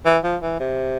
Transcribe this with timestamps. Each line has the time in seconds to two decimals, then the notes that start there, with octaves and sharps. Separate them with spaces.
0.05 E3
0.24 F3
0.42 E3
0.60 C3